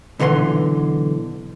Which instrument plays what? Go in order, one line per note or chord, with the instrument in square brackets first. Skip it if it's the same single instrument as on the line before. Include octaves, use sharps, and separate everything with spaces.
[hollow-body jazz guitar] B1 D3 E3 E5 C6